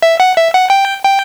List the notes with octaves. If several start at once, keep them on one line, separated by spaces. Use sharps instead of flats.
E5
F#5
E5
F#5
G5
G5